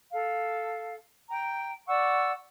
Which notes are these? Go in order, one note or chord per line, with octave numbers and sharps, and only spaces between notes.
A4 F5
G5 A#5
D5 F#5 C#6 E6